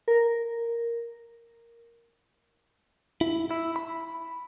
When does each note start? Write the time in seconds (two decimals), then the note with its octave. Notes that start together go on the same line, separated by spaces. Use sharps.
0.08 A#4
3.21 E4
3.51 E4
3.76 B5